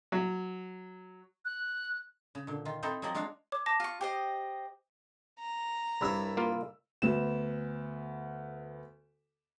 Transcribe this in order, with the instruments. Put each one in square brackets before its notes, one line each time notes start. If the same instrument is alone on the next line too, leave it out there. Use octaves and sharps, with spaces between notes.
[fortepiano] F#3
[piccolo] F#6
[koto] C#3
A#2 D3
D#3 F4
C4 D#4 E4 A4 C5 D#5
F3 F#3 C4 D5 D#5
G#3 D4 F4 F#4 F5
[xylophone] C#5 D6
A5 D6 A#6
[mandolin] F4 C#6
G4 C5 D#5
[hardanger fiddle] A#5
[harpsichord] C2 G2 E5 [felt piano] D5 B5 E6
[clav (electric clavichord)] A#3 F4
[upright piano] D2 B3 E7